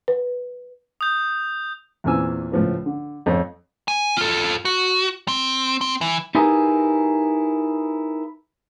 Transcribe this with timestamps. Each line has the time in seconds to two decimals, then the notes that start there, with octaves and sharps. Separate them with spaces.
0.08 B4
1.01 D#6 G6
2.04 E2 A#2 E3 C4 G#5 E6
2.52 C#2 A2 F3 B4
2.86 D3
3.26 F2 C5 C#5
3.88 G#5
4.17 F4 A4
4.65 F#4
5.28 C4
5.81 C4
6.01 E3
6.35 D#4 E4 G4 G#4 A#4 B4